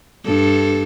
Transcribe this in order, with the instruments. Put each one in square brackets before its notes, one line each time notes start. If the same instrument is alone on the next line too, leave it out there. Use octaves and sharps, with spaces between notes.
[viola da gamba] G2 A4